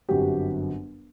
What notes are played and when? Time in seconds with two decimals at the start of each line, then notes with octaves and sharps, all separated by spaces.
0.09 G1 F#2 F#3 C4 F#4 G4